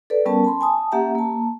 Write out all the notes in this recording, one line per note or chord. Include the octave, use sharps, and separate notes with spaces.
A4 B4 D5
G3 B3 C#4 A#4 A5
A5 B5 C6
G#5 A5 D#6
A#3 C#4 G4 E5 F#5 A#5
A#3 A5